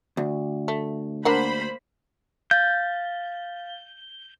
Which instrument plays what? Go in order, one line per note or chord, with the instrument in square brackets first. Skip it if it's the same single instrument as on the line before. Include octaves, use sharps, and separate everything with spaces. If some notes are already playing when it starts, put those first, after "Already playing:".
[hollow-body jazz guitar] D2
[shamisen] A3
[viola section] A#3 C5 B5 [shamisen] D4 A#4 F#5
[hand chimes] F5 A6 [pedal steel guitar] G6